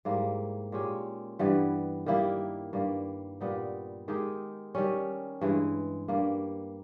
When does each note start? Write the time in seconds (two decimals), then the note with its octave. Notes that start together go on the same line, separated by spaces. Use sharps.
0.05 G#2 G3 A#3 E4
0.72 A#2 G#3 C#4 G4
1.39 G2 E3 G3 B3
2.06 D#3 G3 A#3 E4
2.73 G2 G3 A#3
3.41 A#2 G3 B3 D#4
4.08 D#3 G#3 D#4 G4
4.75 D#3 G3 C#4
5.41 G2 E3 G#3
6.08 G2 G3 A#3